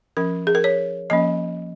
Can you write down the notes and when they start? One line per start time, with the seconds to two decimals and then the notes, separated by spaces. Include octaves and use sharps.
0.17 F3 C#4 A#4
0.47 G#4
0.55 A#4
0.64 C#5
1.10 F3 A#3 C#4 D#5